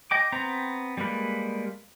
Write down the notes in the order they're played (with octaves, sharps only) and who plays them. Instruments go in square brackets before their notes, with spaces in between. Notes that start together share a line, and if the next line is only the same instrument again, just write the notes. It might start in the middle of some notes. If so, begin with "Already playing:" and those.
[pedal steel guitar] D#5 G5 D6
B3 C4 G5 A#5
G3 G#3 A#3 B4